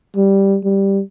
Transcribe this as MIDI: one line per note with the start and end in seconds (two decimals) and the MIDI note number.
0.16 0.58 55
0.64 1.01 55